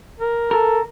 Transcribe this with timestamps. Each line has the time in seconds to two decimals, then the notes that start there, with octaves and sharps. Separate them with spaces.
0.20 A#4
0.51 A4 A#4